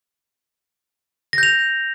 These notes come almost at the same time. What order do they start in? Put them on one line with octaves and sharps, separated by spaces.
A#6 G6 F7